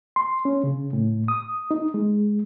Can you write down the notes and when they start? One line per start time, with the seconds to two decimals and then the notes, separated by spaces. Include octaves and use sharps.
0.16 C6
0.45 C#4
0.64 C#3
0.93 A2
1.28 D#6
1.71 D#4
1.94 G#3